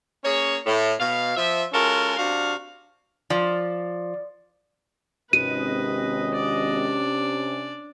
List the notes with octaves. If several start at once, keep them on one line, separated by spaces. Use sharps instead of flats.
A#3 C#4 G#4 C#5
A2
B2 F5
F3 E5
G#3 C#4 F4 F#4 A4 A#4
C3 D4 F#4 F5
F3 D5
G#1 C3 C#4 B4 D#5 D#7
D4 D5